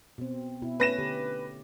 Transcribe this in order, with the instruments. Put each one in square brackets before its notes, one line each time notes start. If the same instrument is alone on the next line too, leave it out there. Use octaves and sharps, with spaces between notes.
[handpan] B2 C4
B2 E4
[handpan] A3 C#4 [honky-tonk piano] B4 A#6 E7
[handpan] D3 G4